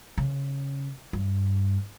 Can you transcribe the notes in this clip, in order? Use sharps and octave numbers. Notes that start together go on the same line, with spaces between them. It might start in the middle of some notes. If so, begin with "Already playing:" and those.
C#3
G2